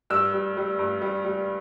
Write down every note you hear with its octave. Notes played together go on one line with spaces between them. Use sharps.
G2 E6
G3
G3
G2
G3
G3